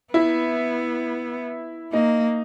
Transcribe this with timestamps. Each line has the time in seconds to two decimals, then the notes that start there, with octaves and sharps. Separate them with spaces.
0.13 B3 E4
1.93 A#3 D#4